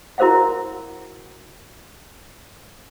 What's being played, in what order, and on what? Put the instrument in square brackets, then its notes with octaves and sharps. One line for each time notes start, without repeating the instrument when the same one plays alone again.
[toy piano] E4 F#4 A#4 C5 F5 F#5